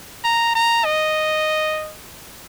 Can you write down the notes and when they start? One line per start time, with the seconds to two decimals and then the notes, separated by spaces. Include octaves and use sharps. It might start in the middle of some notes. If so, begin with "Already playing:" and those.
0.24 A#5
0.55 A#5
0.85 D#5